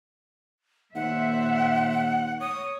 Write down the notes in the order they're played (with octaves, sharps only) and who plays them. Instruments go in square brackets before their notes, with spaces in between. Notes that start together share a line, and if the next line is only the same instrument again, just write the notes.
[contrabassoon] D#2 [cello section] A#2 C5 E5 [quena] F#5
[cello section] C#5 [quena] D#6